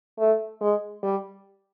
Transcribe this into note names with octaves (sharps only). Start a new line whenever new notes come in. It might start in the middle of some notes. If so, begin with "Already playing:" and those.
A3
G#3
G3